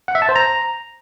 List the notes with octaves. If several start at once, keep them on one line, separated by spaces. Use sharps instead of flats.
F#5
E5
A5
C5
A#5